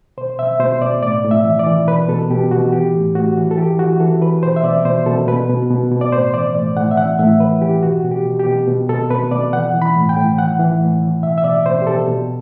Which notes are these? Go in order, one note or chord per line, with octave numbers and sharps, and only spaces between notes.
B2 C5
B2 E5
B2 C5
B2 D5
A2 D5
A2
E5
E3
D5
E3
B2 B4
B2 A4
B2 G4
B2 F#4
E3 G4
A2
A2 F#4
E3
A4
E3 G4
E3 F#4
E3 A4
E3 B4
B2 C5
E5
B2 D5
B2 C5
B2 A4
B2 B4
B2
B2
B2
D5
A2 C5
E3 D5
A2 D5
A2 F#5
E5
E3 F#5
A2 E5
E3 B4
E3 G4
B2 F#4
B2
G4
B2
G4
B2
B2
B2 A4
B2 B4
B2 D5
E3 F#5
E3
B5
A2
G5
A2
E3 F#5
E3
A2
E3
B2 E5
E5
B2 D5
B2 C5
G4
B2 A4
B2